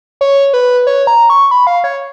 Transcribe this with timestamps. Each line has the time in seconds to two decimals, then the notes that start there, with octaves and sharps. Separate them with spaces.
0.21 C#5
0.53 B4
0.87 C#5
1.07 A#5
1.30 C#6
1.51 B5
1.67 F5
1.84 C#5